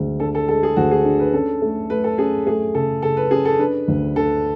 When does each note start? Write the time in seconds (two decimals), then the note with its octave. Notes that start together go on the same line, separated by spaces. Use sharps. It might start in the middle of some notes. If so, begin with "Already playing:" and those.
Already playing: D2 G#3
0.20 D4 A4
0.35 A4
0.48 G#3 A4
0.63 G#4
0.76 D2 F#4
0.91 G#4
1.05 D4
1.20 B4
1.33 C#4 A4
1.62 A3
1.90 A3 B4
2.04 A4
2.18 C#4 G#4
2.46 A3 G#4
2.75 C#3 A4
3.02 C#3 A4
3.17 B4
3.31 C#4 G#4
3.45 A4
3.59 D4 B4
3.88 D2
4.16 D3 A4